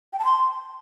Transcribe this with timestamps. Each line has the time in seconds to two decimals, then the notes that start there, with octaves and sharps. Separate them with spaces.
0.13 G5
0.19 A5
0.25 C6